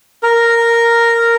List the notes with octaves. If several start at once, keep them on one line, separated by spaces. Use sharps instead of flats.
A#4